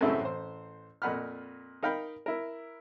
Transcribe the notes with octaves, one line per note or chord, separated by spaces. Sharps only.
F#2 A2 C#3 A3 C4 E4
A1 C5
F2 A#2 F#5 B5 F6
D#4 A#4 F5 G5 B5
E4 A#4